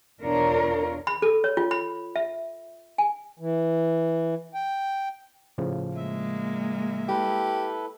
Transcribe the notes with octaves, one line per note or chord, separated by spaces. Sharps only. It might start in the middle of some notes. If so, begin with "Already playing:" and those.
E2 B2 D4 F4 A#4 C#5
B5
A4
C#5
F4
B5
E5
G#5
E3
G5
A2 C#3 F3
G#3 A#3 E5
E4 G4 A4 B4